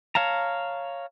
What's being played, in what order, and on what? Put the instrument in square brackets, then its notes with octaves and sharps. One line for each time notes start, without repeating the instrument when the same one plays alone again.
[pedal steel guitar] C#5 F5 A5 A#5